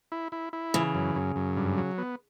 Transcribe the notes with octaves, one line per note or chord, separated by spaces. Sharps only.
E4
E4
E4
C#3 E3
F#2
F#2
F#2
G2
F#3
B3